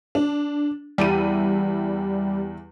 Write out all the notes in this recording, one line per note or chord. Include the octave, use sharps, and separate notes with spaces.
D4
E2 G3 E4 D#7